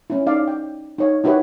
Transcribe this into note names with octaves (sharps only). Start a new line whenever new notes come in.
C#4 E4
D#4 D5 F5
G5
D#4 C#5 F5
D#4 E4 F#4 G4 B4 C#5